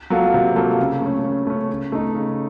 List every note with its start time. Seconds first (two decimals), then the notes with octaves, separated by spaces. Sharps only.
0.10 F#3 A#3 F4 A4
0.34 C3
0.56 F#3 A#3 F4 A4
0.79 C#3
1.02 A3 C#4
1.24 C#3
1.47 A3 C#4
1.69 C#3
1.92 A3 D#4
2.15 C#3